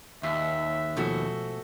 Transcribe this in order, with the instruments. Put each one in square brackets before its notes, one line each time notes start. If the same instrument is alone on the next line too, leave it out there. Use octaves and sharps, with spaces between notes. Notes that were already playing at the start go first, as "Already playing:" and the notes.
[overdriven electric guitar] D#2 [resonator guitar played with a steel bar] A#2 [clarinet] E5
[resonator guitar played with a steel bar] G#2 A3 F#4 [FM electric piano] B2 F3 E6